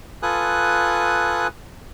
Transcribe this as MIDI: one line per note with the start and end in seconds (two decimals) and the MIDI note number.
0.23 1.47 65
0.23 1.47 69
0.23 1.47 71
0.23 1.47 80
0.23 1.47 87
0.23 1.47 90